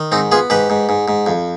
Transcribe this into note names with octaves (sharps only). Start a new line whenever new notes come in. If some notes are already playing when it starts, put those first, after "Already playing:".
Already playing: D#3
G#2 C4 D#4
B3 F4 G#4
G#2 G4 B4
G#2
G#2
G#2
F2